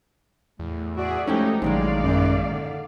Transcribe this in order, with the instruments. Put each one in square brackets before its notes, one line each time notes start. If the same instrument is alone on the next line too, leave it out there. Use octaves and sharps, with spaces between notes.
[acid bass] E2 [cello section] A2
[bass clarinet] F#4 [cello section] G#4 D5 E5
[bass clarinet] F3 [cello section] G#3 A3 A4 [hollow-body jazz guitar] C#4 E4 G4 [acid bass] D#4
[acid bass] A1 [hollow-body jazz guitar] A#2 D#3 G#3 [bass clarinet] F#3 [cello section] D#4 D5 F5
[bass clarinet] F#2
D3